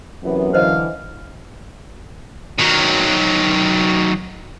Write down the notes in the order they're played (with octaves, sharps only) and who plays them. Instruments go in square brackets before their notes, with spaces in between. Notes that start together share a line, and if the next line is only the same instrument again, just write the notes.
[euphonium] F#2 [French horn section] C3 E3 B3
[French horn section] D3 E3 [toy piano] C5 D#5 [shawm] F5
[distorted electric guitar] D#3 F#3